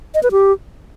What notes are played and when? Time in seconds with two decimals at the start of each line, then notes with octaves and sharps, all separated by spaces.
0.14 D#5
0.23 B4
0.32 G4